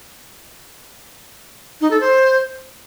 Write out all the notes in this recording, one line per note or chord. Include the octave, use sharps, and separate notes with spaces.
D#4
A4
C5